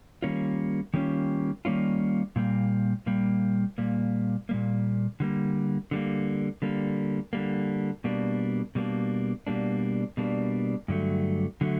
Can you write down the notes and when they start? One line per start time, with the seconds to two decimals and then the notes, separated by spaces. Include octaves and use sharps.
0.22 D#3 G3 A#3 C#4 F4
0.94 D#3 G3 A#3 C#4 F4
1.65 D#3 G3 A#3 C#4 F4
2.36 A#2 G3 A#3
3.06 A#2 G3 A#3
3.78 A#2 G3 A#3
4.49 A#2 G3 A#3
5.20 D3 G3 A#3
5.91 D3 G3 A#3
6.62 D3 G3 A#3
7.33 D3 G3 A#3
8.04 B2 G3 A#3 D4
8.75 B2 G3 A#3 D4
9.47 B2 G3 A#3 D4
10.17 B2 G3 A#3 D4
10.88 G2 D3 F#3 A3
11.61 D3 F#3 A3